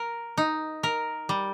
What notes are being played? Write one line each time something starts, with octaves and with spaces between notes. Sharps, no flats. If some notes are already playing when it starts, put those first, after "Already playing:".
Already playing: A#4
D#4
A#4
G3